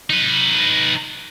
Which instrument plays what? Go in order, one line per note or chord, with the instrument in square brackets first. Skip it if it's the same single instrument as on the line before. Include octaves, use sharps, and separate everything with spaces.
[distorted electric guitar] D#4 B4